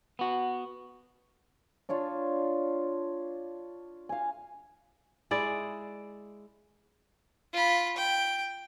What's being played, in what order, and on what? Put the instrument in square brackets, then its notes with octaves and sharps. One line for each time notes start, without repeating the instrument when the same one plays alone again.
[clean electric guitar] B3 F#4
[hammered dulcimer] D4 F4 C#5 A5
F5 G#5
[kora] G#3 E4 G#4 D5
[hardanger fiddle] F4 B5
G5